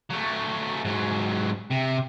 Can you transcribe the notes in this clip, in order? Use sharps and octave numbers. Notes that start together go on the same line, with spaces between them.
F#3 A3
G#2 F#3
C3